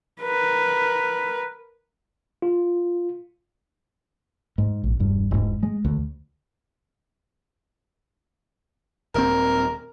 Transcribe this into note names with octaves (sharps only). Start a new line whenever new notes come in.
A#4 B4
F4
G#2
A#1
E1 G2
E1 G#2
G#3
D2
D#1 C4 A#4